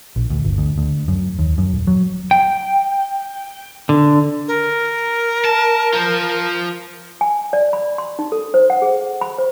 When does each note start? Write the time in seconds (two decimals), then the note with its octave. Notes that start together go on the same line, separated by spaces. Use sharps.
0.16 A#1
0.30 D2
0.45 G1
0.58 D2
0.78 D2
1.08 F#2
1.39 D#2
1.58 F#2
1.72 D#1
1.87 F#3
2.31 G5
3.89 D3
4.48 A#4
5.45 A5
5.93 F4 C5
7.21 G#5
7.53 D5
7.73 B5
7.98 C6
8.19 D#4
8.32 A4
8.54 C5
8.70 F#5
8.82 G#4
9.21 B5
9.38 C5